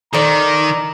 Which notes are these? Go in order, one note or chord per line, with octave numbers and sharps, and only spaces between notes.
D#3 A4 D5 A#5